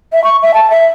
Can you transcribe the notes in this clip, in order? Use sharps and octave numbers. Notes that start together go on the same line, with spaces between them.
E5
C#6
E5
A5
E5